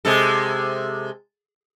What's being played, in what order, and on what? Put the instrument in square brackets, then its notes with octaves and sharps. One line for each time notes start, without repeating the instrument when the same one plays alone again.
[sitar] C3 G#3 A4